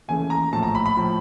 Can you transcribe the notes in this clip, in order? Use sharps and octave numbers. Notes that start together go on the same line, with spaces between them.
D#2 C#3 E3 A3 G#5
A#5
A#1 A2 F3 A5
A#5
B5
B5
A2 F3